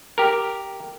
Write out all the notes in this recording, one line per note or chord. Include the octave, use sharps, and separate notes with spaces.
G4 A#4